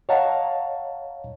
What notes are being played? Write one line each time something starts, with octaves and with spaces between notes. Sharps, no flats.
C#5 D#5 F5 F#5 A5 A#5